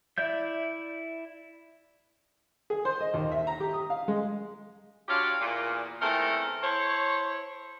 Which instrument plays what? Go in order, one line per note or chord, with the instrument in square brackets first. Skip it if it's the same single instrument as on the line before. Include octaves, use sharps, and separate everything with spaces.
[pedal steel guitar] E4 D5 E5 G6
[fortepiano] G#4
C5
D#5
D#2
E5
A#5
G4
D#6
F5
G#3
[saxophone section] F#3 D4 F4 G4 C#5 F5
E2 A#2
E2 D#3 A3 C4 A4 A#4
E4 A4 C5 C#5